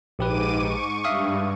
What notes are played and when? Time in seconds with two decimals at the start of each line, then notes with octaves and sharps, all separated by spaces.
0.19 A#1 G#2 G4 B4 D6 D#7
0.56 C#6
1.04 G2 E5 F5 D#6